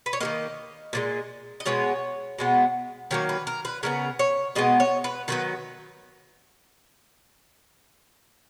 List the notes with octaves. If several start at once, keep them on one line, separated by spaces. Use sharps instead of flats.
B4
C#5
D#3 F#3 A#3 D#5
A#2 F3 G#3
D#5
B2 G#3 B3 C#5
B2 G#3 B3
D#3 F#3 A#3 C#5
B4
A#4
B4
C#3 G#3 B3 A#4
C#5
B2 G#3 B3 D#5
C#5
B4
D#3 F#3 B3 B4